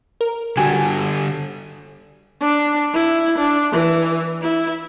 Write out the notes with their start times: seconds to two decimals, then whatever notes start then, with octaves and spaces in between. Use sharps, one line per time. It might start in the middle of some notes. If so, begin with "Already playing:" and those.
0.21 A#4
0.57 D3 G3 F#4 G4 A4 G#5
2.40 D4
2.93 E4
3.38 D4
3.72 E3
4.41 E4